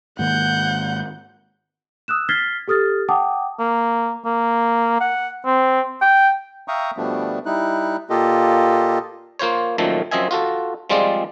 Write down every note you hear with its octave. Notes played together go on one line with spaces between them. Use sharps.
G#2 D#3 A#3 F#5 G6
D#6 E6 F#6 E7
F6 G#6 A6 B6 C7 G7
G4 A4 D#6 F6 A6
F#5 G5 A5 D6 D#6
A#3
A#3
F#5
C4
G5
E5 F5 G5 A#5 C#6 D#6
B2 F3 G3 A3 B3 D4
G3 D#4 E4 F#6
A#2 A#3 F4 G4 A4 D#5
A#3 F4 C5 C#5
F#2 A#2 D#3 F3 A3 A4
F#2 F3 C4 D#5 E5 G#5
F4 F#4 A4
F3 G3 G#3 C4 F4 D5